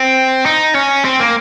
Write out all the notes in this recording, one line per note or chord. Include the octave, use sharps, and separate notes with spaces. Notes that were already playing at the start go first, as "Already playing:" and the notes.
Already playing: C4
D#4
C#4
C4
A#3